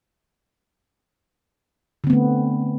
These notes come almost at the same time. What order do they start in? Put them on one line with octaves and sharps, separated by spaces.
D3 C4 B3 A3